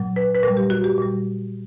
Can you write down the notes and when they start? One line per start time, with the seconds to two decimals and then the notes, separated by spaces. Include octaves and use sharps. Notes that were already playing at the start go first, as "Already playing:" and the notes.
Already playing: A#2 F#3
0.16 B4
0.35 B4
0.43 A#2 G3 A#4
0.57 G4
0.70 F#4
0.84 G4
0.98 A#2 G3